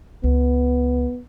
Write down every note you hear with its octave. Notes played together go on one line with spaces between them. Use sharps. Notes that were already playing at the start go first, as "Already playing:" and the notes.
C#2 B3